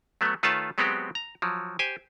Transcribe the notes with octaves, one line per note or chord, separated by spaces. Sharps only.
F#3 A3 B3
D#3 A3 F4 B4 C#5 A5
F#3 G#3 B3 C4 F#4 G4
A#5
F3 F#3
G4 C5 G#5